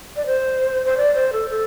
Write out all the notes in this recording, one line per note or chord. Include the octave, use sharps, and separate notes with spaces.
D5
C5
C5
D5
C5
A4
A4